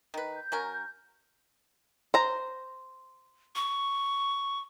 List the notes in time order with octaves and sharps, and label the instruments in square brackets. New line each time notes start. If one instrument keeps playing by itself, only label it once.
[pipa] D#3 B4
[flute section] G6
[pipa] F#3 C#4 A#4
[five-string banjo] C5 A#5
[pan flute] C#6